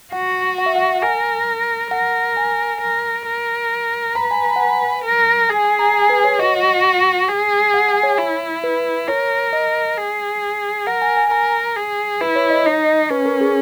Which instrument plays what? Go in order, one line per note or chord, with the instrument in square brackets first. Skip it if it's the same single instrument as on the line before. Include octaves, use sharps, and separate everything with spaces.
[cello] F#4 [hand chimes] F#5
[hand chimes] F#5
E5
F#5
[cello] A#4 [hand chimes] G#5
[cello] A#4 [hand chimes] F#5
[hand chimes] G#5
[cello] A#4
A#4
[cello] B4 [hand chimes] A#5
[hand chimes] G#5
A#5
F#5
G#5
[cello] A#4
[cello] G#4 [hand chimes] G#5
[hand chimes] G#5
A#5
G#5
B4
C#5
[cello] F#4 [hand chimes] D#5
[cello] G#4
[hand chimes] F#5
G#5
C#5
[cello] E4
[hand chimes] B4
[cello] A#4 [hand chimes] C#5
[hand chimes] D#5
[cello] G#4
[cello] A#4 [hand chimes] F#5
[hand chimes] G#5
G#5
[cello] A#4 [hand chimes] A#5
[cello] G#4
[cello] E4 [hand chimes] B4
[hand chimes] C#5
D#5
[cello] D#4 [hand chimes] D#5
[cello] C#4 [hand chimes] B4
[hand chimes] A#4
G#4